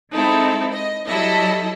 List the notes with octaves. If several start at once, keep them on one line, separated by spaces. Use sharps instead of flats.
G#3 C4 D#4 E4 A4
D#5
F#3 G3 E4 A4 D#5